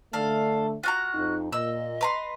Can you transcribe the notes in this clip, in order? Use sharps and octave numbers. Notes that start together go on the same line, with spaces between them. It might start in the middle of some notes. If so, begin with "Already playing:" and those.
D3 A3 A4 D5 F5
F4 F#4 A#5 F#6
F2 D#4
A#2 D#5 E6
B4 A#5 C6